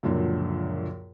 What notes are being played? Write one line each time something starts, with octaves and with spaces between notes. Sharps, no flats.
C#2 F#2 A#2 D3 F3 F#3